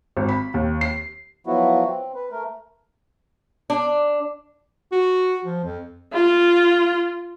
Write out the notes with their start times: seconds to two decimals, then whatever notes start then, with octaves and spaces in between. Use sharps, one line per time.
0.17 G#1
0.29 B5
0.54 D#2
0.81 C7
1.47 F3 F#3 B3 E4 F#4
1.87 C4
2.15 B4
2.32 A3 A#4
3.70 D4
4.92 F#4
5.44 F3
5.64 F2
6.13 F4